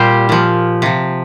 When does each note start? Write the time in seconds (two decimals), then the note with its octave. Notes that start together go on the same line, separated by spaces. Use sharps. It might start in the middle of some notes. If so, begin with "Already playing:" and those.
Already playing: A#2 G3 G4 C5
0.29 A#2 F3
0.82 C3 F3